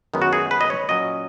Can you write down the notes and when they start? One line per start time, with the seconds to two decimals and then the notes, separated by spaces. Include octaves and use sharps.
0.14 F#2 D#3 G#3 B3
0.22 F#4
0.33 G#4
0.51 B4
0.61 D#5
0.70 C#5
0.89 A#2 F#3 C#4 D#5